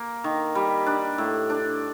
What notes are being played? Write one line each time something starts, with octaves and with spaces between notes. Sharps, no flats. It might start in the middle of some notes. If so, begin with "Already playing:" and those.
Already playing: A#3
D#3
G3
D4
A2
D4